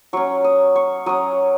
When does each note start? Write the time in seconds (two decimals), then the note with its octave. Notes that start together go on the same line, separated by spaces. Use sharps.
0.13 F#3 C#4 C#6
0.44 D#6
0.76 C#6
1.06 F#3 C#4 D#6